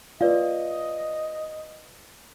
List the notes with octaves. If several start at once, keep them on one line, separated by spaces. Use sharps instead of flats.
F4 B4 D5 D#5 F5